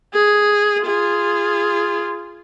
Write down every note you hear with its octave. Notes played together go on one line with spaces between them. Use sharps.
G#4
F4 G#4